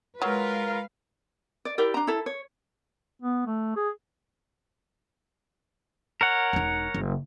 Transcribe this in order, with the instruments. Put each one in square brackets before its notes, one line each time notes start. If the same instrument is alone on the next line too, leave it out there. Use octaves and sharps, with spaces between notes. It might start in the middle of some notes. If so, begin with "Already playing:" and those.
[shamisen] F#3 [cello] G#3 F5 [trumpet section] F4 A#4 [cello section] B4
[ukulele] D5
E4 G4 A#4 D5
D4 A#5
E4 A4
C#5
[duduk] B3
A3
G#4
[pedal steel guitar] A#4 C#5 F#5
[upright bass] E1 D#4
F#1